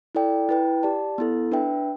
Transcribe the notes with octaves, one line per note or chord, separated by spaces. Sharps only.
E4 A4 D5 G5
E4 B4 G5
G4 D5 A5
B3 E4 A4
D4 B4 E5 G5